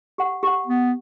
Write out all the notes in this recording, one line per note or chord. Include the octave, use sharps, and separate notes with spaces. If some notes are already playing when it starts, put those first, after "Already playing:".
G4 F#5
G4 F#5
B3